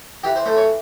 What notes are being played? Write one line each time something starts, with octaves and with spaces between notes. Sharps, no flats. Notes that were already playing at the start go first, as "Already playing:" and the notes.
E3 G4
C5
A3 C5
C#5